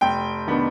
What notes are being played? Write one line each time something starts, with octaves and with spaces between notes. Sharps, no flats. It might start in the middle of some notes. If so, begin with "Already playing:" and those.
F1 G5
D#3 B3 D4